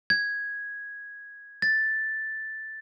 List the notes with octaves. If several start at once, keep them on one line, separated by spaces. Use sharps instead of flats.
G#6
A6